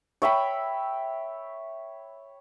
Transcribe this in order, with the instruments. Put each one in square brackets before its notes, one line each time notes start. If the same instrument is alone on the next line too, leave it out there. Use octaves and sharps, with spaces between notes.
[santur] C#5 E5 G5 B5